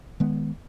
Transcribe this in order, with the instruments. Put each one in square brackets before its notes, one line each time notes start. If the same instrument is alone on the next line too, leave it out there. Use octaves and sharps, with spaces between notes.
[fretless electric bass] D#3 G#3 B3